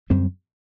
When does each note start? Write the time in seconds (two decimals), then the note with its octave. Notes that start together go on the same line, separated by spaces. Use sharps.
0.10 F#2 D3 G3 C4